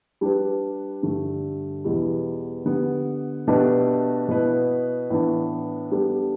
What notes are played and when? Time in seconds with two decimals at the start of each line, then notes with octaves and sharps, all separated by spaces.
0.21 G3 D4 G4 B4
1.03 G2 D3 A3 G4
1.84 E2 B2 G3 E4
2.66 D3 B3 G4
3.47 B2 A3 D4 G4 B4
4.28 B2 B3 E4 B4
5.10 A2 E3 B3 D4
5.91 G3 B3 D4 A4